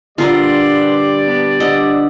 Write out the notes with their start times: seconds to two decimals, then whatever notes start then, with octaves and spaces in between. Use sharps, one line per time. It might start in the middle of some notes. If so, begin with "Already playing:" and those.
0.18 A#2 D3 G3 F4 A#4 B4 D5 C6
1.25 B3 D4
1.60 D3 B4 D#5